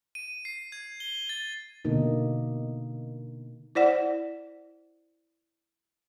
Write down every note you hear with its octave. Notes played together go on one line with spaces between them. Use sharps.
D#7
C7
G#6
G7
A6
B2 D3 A#3 D#4
E4 C5 D5 F#5